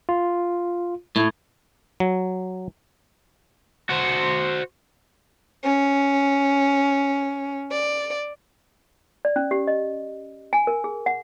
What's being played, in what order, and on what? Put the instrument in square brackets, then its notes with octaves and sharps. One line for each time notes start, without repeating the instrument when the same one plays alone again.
[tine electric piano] F4
[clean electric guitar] A2
[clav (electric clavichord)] F#3
[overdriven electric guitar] F#4 C5
[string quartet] C#4
D5
[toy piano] D5
C#4
G4
D#5
G#5
A#4
G#4
F#5